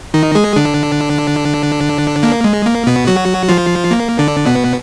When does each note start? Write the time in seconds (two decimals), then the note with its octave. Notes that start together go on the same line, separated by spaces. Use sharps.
0.14 D#3 D#4
0.35 G#3 G#4
0.56 D3 D4
2.23 A#3
2.44 G#3
2.66 A#3
2.87 B2 B3
3.07 F#3 F#4
3.49 F3 F4
3.91 A#3
4.19 D3 D4
4.46 B2 B3